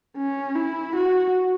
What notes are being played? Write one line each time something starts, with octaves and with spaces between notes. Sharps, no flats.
C#4
E4
F#4